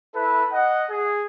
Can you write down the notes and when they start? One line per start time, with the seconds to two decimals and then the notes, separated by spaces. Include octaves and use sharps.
0.14 E4 A4 B4
0.52 D#5 F#5
0.90 G#4